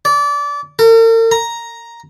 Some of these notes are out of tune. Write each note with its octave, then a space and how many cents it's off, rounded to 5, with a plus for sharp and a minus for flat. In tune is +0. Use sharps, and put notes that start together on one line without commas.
D5 -25
A#4 -45
A#5 +5